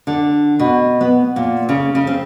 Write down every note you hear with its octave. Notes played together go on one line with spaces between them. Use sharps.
D3
B2
B3
A#2
C#3
C#3
C4